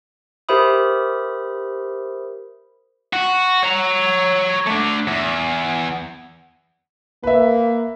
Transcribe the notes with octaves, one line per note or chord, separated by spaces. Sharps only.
G4 A#4 C5 E5 B5 D#6
F#4
C#5 A#5
A3 D4
E2
A#3 B4 E5